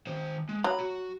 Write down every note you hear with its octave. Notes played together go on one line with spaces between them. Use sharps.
D#3 C5
G#3
F#3 B5
F#4